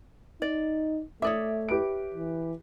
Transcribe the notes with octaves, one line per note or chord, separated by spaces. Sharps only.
D#4 D5
A3 C#5 D5 E5 D6 D#6
G4 B4 D7
E3